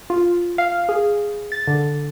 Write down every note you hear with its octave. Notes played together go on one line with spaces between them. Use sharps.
F4
F5
G#4
A6
D3